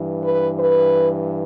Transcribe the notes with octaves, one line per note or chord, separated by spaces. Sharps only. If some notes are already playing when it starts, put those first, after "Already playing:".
Already playing: G2 E3
B4
B4